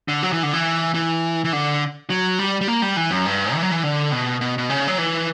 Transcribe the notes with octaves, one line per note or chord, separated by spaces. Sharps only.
D3
F#3
E3
D3
E3
E3
E3
D3
F#3
G3
G3
A#3
G3
E3
F#2
G2
E3
F#3
E3
D3
B2
B2
B2
C#3
F#3
E3